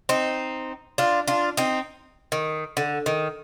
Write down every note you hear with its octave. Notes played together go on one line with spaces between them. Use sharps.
C4 D#4
D4 F4
D4 F4
C4 D#4
D#3
D3
D#3